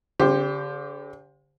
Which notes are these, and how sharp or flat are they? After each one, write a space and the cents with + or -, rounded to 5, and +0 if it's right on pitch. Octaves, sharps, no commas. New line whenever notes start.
D3 -45 G4 +15 C5 +0